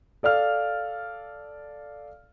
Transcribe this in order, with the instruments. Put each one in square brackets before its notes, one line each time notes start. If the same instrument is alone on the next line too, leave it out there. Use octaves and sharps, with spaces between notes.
[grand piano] A4 D5 F5 F6